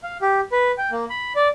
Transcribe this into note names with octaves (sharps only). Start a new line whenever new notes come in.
F5
G4
B4
G5
A#3
B5
D5